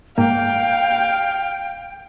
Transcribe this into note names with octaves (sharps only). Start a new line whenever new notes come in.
G#2 A#3 F5 G5